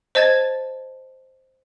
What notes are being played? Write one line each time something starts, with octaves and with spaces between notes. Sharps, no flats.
C5 D#5 A5 G#6 A6